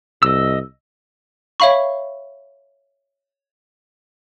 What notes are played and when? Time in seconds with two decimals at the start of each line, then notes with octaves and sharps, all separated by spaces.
0.23 C2 D#5 E6
1.60 C#5 E5 F5 B5 C#6